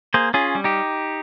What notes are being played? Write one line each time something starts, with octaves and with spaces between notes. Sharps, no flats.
A#3 G#4 C5
C#4 F4 G#4
G3
D#4 G4